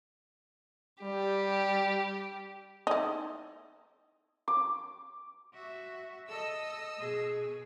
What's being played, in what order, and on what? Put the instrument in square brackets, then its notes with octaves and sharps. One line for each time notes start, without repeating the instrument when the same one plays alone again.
[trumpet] G3 [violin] G4
[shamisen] D#4 E4
[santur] D6
[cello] F#4 E5
[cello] A4 [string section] D#5 E6
[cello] B2 G#4